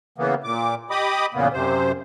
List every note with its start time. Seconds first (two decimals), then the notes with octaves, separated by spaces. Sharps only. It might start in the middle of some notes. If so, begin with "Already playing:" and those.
0.18 C#3 E3 A#3 B3
0.44 A#2 D6
0.91 G4 D#5 B5 D6 D#6
1.35 E2 A#2 C#3 A#3 B3
1.53 F#2 C3 C5